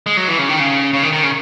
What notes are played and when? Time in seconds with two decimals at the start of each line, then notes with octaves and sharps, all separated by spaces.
0.06 G#3
0.17 F#3
0.28 E3
0.38 C#3
0.49 D#3
0.60 C#3
0.93 C#3
1.03 D#3
1.13 D#3
1.24 C#3